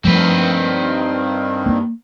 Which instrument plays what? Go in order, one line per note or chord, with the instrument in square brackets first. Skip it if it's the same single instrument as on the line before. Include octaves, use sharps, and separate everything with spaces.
[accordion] G2 D#3 [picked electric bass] F3 G3 A3 [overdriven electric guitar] C4 B4
[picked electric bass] A#3